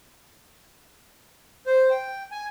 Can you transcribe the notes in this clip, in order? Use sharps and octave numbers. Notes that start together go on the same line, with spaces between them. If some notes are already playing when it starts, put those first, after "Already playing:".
C5
G5
G#5